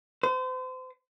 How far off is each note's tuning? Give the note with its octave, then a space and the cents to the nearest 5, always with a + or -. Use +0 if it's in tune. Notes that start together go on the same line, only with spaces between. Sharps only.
C5 -35